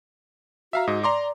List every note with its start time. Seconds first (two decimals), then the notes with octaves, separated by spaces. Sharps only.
0.73 F#4 E5 F5 A#5
0.87 G#2 D#5
1.04 D5 A#5 C6 D6